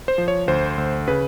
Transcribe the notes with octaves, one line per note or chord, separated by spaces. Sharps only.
C5
F3
C#5
D2 C5
D2
C#3 B4